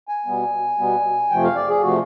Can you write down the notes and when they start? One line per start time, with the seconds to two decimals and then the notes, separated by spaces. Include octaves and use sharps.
0.08 G#5
0.26 B2 G3 B3
0.78 B2 G3 B3
1.30 F2 C3 F3 A3 G5
1.43 F5
1.56 D5
1.68 G#4
1.82 C3 F3 A3 F#4